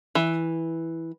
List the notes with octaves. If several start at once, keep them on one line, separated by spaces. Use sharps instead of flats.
E3